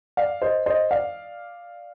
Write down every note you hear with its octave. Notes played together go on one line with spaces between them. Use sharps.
D5 F5
C5 D#5
C5 D#5
D5 F5